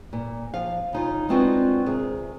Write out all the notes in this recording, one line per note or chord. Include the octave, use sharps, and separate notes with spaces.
A#2
F3 F5
C#3 D#4 F4
G#3 B3 C4 D4 F4 F#4
C3 G#4 A#4